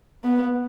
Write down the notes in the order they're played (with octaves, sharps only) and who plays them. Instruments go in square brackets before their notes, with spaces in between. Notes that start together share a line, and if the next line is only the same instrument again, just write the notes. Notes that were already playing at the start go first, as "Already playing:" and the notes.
[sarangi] B3